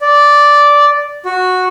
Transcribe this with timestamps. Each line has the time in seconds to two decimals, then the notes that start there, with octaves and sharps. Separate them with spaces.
0.01 D5
1.26 F#4